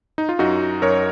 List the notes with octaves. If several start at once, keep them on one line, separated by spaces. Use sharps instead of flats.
D#4
F4
F#2 D#4 F#4
F#2 A#4 C#5